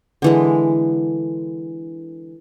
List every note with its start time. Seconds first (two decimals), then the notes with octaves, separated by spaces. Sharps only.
0.22 D3 E3 G#3